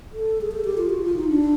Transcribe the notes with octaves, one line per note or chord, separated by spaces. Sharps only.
A4
G#4
A4
G4
F4
F#4
F4
D#4
D4